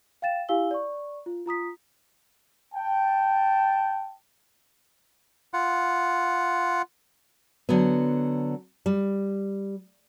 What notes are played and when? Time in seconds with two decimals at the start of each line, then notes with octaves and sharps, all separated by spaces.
0.22 F5 G5 A6 E7
0.49 E4 G4 F5 G#5 E6 G7
0.71 D5 C#6
1.26 F4
1.46 F4 A#5 D#6 B6
2.75 G5 A5
5.54 F4 F#5
7.69 D3 F#3 B3
8.86 G3